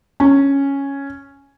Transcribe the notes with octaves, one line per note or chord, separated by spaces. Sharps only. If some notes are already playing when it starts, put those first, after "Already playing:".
C#4